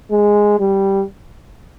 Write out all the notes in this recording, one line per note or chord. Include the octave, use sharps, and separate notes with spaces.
G#3
G3